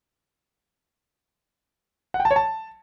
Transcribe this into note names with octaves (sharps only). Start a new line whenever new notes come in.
F#5
G5
A5
C#5
A5